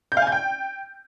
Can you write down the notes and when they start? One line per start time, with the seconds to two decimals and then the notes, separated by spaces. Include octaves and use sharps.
0.12 G6
0.17 F5
0.22 G#5
0.27 G6
0.32 G5